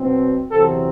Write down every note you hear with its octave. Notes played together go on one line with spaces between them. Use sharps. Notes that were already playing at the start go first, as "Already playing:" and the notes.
Already playing: B2 F#3 C4
E2 C3 F#3 C4 A4